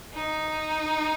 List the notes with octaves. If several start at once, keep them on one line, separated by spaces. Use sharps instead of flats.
D#4